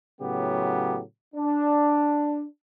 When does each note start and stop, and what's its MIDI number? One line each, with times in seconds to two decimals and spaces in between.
0.21 1.00 45
0.21 1.00 49
0.21 1.00 54
0.21 1.00 59
0.21 1.00 67
1.35 2.44 62